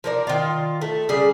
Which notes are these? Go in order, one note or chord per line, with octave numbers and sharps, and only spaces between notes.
F3 A#4 D5
D#3 F4
A3
C#3 G3 G#4